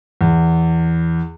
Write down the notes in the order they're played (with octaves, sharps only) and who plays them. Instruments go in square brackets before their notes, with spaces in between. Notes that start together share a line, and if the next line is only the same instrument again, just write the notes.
[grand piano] E2